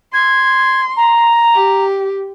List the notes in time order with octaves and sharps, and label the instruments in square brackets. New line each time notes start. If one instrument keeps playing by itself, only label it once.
[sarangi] C6 [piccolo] G#6
[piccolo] A#5
[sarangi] G4